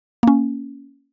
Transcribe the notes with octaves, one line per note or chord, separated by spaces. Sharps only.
A#3 C#4